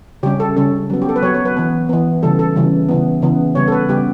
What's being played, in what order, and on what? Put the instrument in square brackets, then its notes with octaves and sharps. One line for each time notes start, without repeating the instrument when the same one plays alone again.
[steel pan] C#3 G3 C#4 G4
A4
C#3 G3 C#4 A4
F#3 B3
G4
A4
B4
F#3 B3 C#5
C#5
B4
E3 B3
E3 B3
C#3 E3 G3 A4
A4
C#3 E3 G3
C#3 E3 B3
C#3 E3 B3
C#3 G3 B3 C#5
A4
B4
C#3 G3 B3 G4